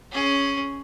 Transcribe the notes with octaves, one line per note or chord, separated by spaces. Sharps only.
C#4 G#4